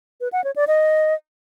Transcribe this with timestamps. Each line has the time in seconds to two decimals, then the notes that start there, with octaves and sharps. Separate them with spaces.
0.21 B4
0.32 F#5
0.44 C#5
0.56 D5
0.67 D#5